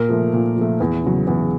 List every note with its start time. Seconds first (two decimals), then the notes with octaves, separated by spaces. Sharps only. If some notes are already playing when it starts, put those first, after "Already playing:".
Already playing: A#2 A#4
0.09 F3 A3
0.33 A#2
0.56 F3 A3
0.80 E2
1.03 C#3 F#3
1.27 E2